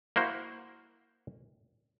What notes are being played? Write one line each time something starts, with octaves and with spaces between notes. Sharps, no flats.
A#3 E4 F#4 C5